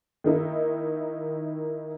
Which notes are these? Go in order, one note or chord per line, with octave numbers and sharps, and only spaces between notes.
D#3 A#3 D#4 E4